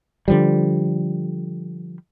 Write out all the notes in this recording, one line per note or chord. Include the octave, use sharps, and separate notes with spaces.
D3 F3 G3